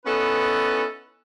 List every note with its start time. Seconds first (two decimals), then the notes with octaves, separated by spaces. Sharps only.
0.06 B3 C#4 D#4 E4 A4 B4